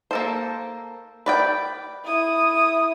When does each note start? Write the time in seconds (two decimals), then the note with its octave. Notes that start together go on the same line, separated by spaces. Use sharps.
0.11 A#3 A4 C5
1.26 B4 D5 G5
2.04 E4 D#6